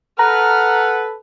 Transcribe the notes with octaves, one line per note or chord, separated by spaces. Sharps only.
A4 B4 F#5 A#5 F6